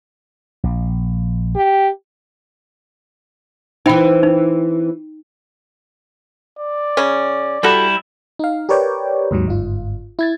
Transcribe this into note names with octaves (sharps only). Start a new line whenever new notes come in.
A#1
G4
E3 C4 D#4 G5 B5
D#4
D5
C#3 C#4
G3 E4 F#4 A4 B5
D#4 F5
G4 A#4 B4 C#5 D5 G5
D#2 G#2 D#3 F#3
G1 G#2 F4
E4 G#6 A6